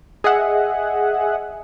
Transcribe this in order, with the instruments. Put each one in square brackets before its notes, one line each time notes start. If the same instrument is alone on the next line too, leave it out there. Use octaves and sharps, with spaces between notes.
[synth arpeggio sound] G#4 D#5 E5 F#5